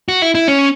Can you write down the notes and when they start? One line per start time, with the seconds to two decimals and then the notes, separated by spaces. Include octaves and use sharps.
0.09 F#4
0.22 E4
0.35 E4
0.48 C#4